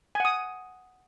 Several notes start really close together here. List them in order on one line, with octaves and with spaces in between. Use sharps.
G#5 F#5 D#6